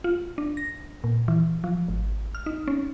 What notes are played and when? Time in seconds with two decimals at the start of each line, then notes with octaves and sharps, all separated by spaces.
0.04 F4
0.38 D4
0.57 A#6
1.04 A#2
1.28 E3
1.64 F3
1.88 G#1
2.35 F6
2.46 D#4
2.68 C#4